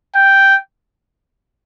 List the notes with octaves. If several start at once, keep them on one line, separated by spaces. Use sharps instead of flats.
G5